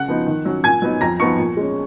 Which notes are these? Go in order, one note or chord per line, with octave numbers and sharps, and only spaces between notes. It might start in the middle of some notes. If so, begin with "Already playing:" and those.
Already playing: C#3 F#5 F#6
F3 B3 D#4
D#3
F#3 C#4
A#2 G#5 G#6
F#3 B3 D#4
F2 A#5 A#6
F3 B3 D#4 C#6 C#7
A#2
G#3 C#4